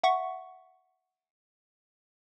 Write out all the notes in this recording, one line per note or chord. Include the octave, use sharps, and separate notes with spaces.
E5 F#5 C#6